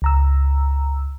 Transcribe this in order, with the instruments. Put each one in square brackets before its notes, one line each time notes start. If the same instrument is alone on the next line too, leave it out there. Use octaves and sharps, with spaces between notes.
[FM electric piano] C#2 A#5 E6